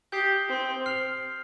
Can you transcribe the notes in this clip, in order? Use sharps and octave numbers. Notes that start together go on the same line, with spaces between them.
G4 D#6 G6 C7 G7
C4
F6 C7 F7